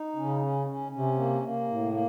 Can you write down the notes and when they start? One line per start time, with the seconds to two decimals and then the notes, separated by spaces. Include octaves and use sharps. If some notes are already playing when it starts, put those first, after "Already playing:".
Already playing: D#4
0.16 C#3 C#4
0.41 C#4
0.67 C#4
0.91 C3 C#4
1.17 A#3
1.42 A#3
1.68 A2
1.93 A#3